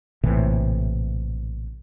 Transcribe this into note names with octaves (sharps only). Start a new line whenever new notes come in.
A#1 A2 C3 E3